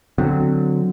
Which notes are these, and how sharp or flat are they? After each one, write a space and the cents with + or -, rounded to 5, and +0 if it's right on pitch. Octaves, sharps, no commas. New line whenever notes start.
D3 +0 F#3 -15 C4 -20